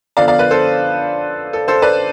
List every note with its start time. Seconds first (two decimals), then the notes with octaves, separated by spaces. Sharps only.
0.17 D3 F3 B3 D4 D5 F5
0.28 D5 F5
0.39 B4 D5
0.51 A4 C5
1.53 A4
1.68 A4 C5
1.82 B4 D5